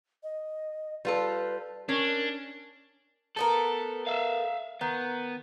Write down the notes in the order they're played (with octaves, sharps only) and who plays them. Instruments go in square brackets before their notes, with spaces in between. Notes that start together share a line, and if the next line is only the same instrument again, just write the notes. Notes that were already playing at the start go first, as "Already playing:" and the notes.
[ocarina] D#5
[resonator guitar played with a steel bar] G3 F4 A4 [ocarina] B4
[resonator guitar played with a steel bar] C#4 [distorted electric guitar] D4 [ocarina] A#4
[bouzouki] A3 B3 A#4 [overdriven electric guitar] A4
[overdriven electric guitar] E5 F5
[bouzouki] D#3 [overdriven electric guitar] B3